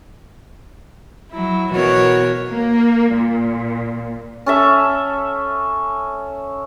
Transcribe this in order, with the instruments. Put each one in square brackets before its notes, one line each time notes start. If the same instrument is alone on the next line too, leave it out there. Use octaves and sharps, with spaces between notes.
[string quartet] F#3 E4
B2 E3 B3 F#4 A#4 C#5
[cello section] A#3
A#2
[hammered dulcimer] C#4 A4 E5